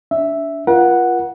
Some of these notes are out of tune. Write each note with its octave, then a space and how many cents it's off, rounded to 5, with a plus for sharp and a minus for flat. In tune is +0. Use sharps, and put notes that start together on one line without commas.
D4 -25 E5 +0
F4 -15 A#4 +45 F#5 +0